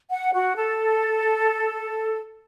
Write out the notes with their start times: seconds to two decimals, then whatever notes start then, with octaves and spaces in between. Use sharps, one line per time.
0.10 F#5
0.33 F#4
0.55 A4